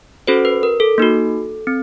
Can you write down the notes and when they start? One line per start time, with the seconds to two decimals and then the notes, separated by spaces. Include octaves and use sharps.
0.27 C#4 F#4 A4 C5
0.45 B4
0.63 A#4
0.80 A4
0.98 A#3 D#4 F#4
1.67 C4